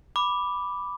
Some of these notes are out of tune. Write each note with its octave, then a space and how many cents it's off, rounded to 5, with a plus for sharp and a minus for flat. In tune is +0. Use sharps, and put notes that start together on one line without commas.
B5 +0 D6 +0